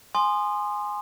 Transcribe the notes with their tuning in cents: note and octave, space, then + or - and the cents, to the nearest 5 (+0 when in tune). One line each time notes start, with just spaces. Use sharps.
G#5 +0 C6 +0 D#6 -30